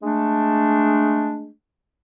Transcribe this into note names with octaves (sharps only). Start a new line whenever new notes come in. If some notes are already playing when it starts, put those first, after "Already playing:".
G#3 A3 D4